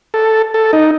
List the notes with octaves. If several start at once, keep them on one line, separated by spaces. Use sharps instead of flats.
A4
A4
D#4